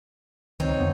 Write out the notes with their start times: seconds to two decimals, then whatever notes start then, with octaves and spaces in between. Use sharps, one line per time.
0.60 C#2 D#3 C4 D#4 C#5
0.79 F2 D3 B3